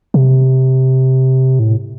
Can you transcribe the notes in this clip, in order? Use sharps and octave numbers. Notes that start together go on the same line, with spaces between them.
C3
A2